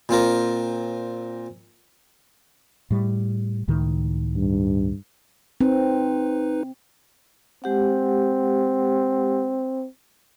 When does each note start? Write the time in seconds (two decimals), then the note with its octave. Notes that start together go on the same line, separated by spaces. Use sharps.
0.09 A#2 C4 F4 A#4
2.90 A2 G3
3.68 C#2 A2 D#3
4.36 G2
5.61 C4 D#4 B4
7.64 G#3 C4 G4 F#5